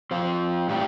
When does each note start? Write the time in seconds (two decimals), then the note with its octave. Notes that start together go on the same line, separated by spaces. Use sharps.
0.11 F3 C4 F4
0.69 A2 G3 D4 G4